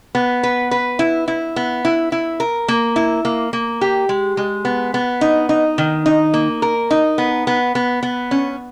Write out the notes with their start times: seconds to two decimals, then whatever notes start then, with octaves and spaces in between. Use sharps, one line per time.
0.15 B3
0.43 B4
0.71 B4
0.99 E4
1.28 E4
1.56 B3
1.85 E4
2.12 E4
2.40 A#4
2.68 A#3
2.96 E4
3.25 A#3
3.53 A#3
3.81 G4
4.09 G#3
4.37 G#3
4.65 B3
4.94 B3
5.21 D#4
5.49 D#4
5.78 D#3
6.06 D#4
6.34 A#3
6.62 A#4
6.91 D#4
7.18 B3
7.47 B3
7.75 B3
8.03 B3
8.31 C#4